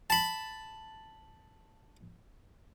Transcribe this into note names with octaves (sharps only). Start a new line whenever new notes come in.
A5 B5